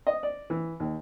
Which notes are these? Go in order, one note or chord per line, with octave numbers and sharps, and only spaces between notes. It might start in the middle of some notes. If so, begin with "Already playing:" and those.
D#5
D5
E3
D#2